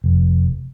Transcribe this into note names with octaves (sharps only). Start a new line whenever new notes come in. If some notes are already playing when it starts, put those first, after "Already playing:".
F1